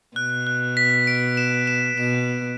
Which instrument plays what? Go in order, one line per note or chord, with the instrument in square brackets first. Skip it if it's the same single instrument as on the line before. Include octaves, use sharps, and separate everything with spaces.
[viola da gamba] B2 [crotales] F#6
[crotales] F#6
B6
D7
E7
E7
[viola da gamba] B2 [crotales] E7